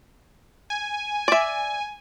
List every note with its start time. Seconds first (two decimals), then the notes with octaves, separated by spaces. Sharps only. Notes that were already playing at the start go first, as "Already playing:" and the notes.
0.70 G#5
1.28 D5 E5